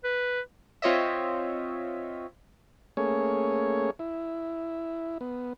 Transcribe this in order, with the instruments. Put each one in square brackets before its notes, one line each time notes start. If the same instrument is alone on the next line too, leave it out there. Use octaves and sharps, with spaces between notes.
[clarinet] B4
[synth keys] C4 F4 C#5 D#5 E5
[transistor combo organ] A3 A#3 C#4 G#4 C#5
E4
B3